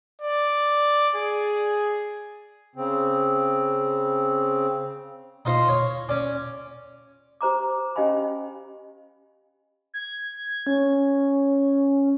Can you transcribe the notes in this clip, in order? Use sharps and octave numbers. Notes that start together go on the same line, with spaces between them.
D5
G#4
C#3 C4
D#4 F4 C5 D#5
C#5
C#4 D5
G4 C5 A#5 D6
C#4 G4 D#5 F5 G#5 B5
G#6
C#4